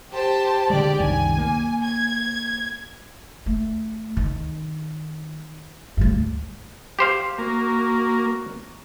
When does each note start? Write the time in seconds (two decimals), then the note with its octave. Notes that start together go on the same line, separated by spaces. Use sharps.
0.12 G4 C5 A5
0.70 D3 G#3 G4 D5
0.99 C2 F#2 D#3 G#5
1.38 A#3
1.83 G#6
3.46 A3
4.17 D#3
5.97 D2 G2
6.99 G4 C5 F5
7.38 A#3 F#4